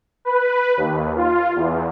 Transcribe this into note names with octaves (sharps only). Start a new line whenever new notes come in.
B4
D#2
F4
E2